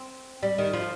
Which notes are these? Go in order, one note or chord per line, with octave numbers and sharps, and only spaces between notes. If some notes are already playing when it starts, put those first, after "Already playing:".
Already playing: C4
G3
D#3
F3